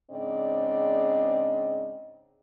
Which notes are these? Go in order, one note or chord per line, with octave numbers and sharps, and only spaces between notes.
G#2 C#3 C4 D4 D5 D#5